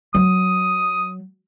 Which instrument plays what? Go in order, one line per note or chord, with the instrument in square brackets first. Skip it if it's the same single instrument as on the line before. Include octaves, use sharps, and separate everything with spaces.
[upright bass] F#3 [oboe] D#6